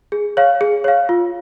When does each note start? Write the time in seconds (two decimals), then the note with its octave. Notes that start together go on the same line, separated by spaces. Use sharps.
0.12 G#4
0.37 C#5 F5
0.61 G#4
0.84 C#5 F5
1.09 F4